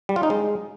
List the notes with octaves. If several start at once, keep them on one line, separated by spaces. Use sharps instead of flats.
G3
F4
D#4
G#3